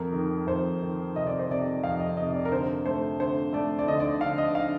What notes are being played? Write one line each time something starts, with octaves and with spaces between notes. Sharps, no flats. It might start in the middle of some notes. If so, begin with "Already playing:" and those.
Already playing: F2 A#4
D#3
F2 C5
D#3
C3 D#5
D5
C5
C3 D5
F2 F5
D#5
C3 D#5
D5
A#4
D3 C5
A3 C5
D3 C5
A3 D5
D5
D3 D#5
D5
D#5
D3 F5
D#5
D3 F5